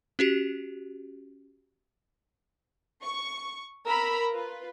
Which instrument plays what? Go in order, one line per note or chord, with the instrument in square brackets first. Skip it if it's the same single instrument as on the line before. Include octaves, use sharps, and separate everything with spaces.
[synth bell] C#4 F#4 G4
[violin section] C#6
A#4 A#5 B5 E6
F4 B4